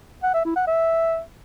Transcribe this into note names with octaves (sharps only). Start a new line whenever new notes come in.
F#5
E5
E4
F#5
E5